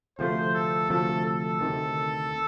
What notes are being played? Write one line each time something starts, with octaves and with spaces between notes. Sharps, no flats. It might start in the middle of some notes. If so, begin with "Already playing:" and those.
D2 C3 F3 A3 C5
A4
D2 C3 F3 A3 A4
A4
D2 C3 D#3